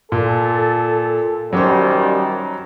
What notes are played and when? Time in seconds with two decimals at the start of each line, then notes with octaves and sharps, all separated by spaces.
0.12 A#2 A4
1.53 F#2 D#3 F#3 G3 C#4 C5